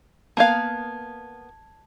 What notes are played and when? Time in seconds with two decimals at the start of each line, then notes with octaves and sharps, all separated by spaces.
0.37 A#3 B3 F5 A5 G#6